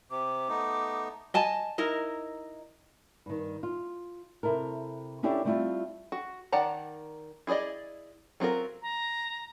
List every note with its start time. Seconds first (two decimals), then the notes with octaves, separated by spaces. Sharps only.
0.11 C3 D6
0.49 A3 B3 D#4
1.34 D#5 G#5 A5
1.78 D#4 E4 A#4 D#5
3.26 G2 D#3
3.63 F4
4.43 C3 E4 A4 A#4
5.23 C#4 D4 E4 G4 A4 C#5
5.45 G3 A3 C4 D4 E4 F4
6.12 F#4
6.52 D#3 D5 F#5 A5 A#5
7.47 E4 G#4 C5 D5 D#5
8.40 F#3 C4 F4 A#4
8.82 A#5